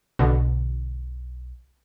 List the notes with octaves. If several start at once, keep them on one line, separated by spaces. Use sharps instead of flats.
B1 B2 D3